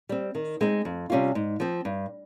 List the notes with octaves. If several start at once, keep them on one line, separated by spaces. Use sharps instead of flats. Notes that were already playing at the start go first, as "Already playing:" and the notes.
G3 C4
D#3
G#3 C4 D#4
F2
C3 G3 C#4 F4
G#2
F3 C4
G2